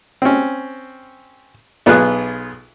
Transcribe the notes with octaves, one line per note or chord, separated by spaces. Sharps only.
C4 C#4
B1 B3 F4 G#4 F#6